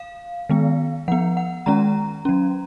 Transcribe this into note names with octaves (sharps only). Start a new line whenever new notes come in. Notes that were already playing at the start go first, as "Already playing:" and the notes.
Already playing: F5
D#3 G#3 B3
F3 B3 F#5
F#5
D#3 G#3 C#4 A#5
F#3 C#4